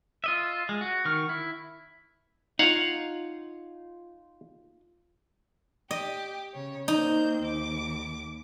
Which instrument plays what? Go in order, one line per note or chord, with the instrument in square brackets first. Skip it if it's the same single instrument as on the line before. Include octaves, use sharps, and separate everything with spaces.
[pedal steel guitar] F4 D#5 E5
G#3
F#4
D#3 C#6 F6
E4
[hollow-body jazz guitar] D#4 F4 [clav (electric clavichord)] C#5 F5 F#5
[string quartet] G4 [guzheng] D#5
[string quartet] C#3 C#5
[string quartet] A#3 C4 G6 [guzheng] D#4
[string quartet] D#2 D6